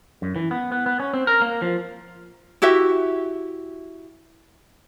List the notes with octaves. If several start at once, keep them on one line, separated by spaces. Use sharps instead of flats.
F#2
E3
B3
B3
B3
C#4
C4
A#4
A#3
F3
E4 F#4 G4 E5